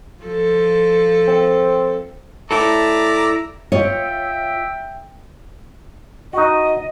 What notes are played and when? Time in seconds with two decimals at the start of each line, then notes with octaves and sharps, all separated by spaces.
0.24 F3 A4
1.28 C4
2.51 E4 A4 D5 E5 A#5
3.72 F4 C#5 D#5 E5 G5
6.33 D#4 F#4 D#5